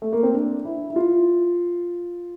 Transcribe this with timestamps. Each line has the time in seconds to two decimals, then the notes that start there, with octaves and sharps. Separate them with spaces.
0.02 A3
0.13 A#3
0.23 C4
0.34 D4
0.65 E4
0.90 E4
0.96 F4